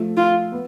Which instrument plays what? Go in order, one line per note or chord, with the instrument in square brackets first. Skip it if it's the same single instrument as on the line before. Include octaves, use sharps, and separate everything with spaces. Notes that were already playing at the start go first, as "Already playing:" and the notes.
Already playing: [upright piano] F3 A3
[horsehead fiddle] F4
[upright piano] B3